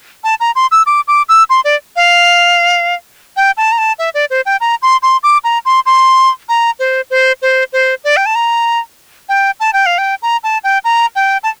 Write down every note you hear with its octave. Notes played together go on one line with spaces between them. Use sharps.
A5
A#5
C6
E6
D6
D6
E6
C6
D5
F5
G5
A5
A#5
A5
E5
D5
C5
G5
A#5
C6
C6
D6
A#5
C6
C6
A#5
C5
C5
C5
C5
D5
G5
A5
A#5
G5
A5
G5
F5
G5
A#5
A5
G5
A#5
G5
A5